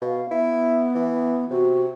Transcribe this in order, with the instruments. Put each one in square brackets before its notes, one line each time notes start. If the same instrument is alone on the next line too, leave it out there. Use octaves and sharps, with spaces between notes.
[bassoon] B2 [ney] F5
[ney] B3 [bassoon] E4
[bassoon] E3
[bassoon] C3 [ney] F#4